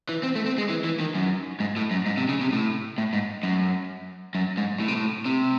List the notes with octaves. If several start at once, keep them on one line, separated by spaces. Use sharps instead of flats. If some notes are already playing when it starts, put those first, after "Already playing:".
E3
C4
A3
C4
G#3
E3
E3
D#3
F#2
G#2
A2
F#2
G#2
C3
C#3
C3
A2
A2
G#2
F#2
F#2
G#2
A2
C3
A2
C3